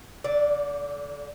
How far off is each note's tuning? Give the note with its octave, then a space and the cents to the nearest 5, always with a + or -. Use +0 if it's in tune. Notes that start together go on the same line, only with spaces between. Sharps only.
D3 -30 D5 +0